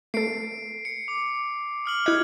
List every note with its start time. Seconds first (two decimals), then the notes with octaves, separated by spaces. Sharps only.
0.14 A3 A4 C7 D7
0.85 C#7
1.08 D6
1.86 D#6 F6 F#7
2.06 E4 D#5 D#6 F#6 G#6